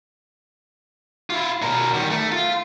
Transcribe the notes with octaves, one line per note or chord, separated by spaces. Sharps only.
E4 F4
B2 A#4
D#3 G3
A3
F4